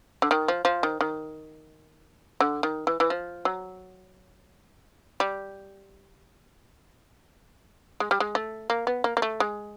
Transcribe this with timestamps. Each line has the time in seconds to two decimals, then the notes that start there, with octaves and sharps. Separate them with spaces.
0.22 D3
0.31 D#3
0.48 F3
0.65 F3
0.83 D#3
1.01 D#3
2.40 D3
2.63 D#3
2.87 E3
3.00 E3
3.10 F3
3.45 F#3
5.20 G3
8.00 G#3
8.11 G3
8.20 G#3
8.35 A3
8.70 A#3
8.87 B3
9.04 A#3
9.17 A#3
9.22 A3
9.40 G#3